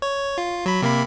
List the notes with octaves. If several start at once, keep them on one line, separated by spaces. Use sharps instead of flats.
C#5
F4
F#3 B5
C3 A#3 B5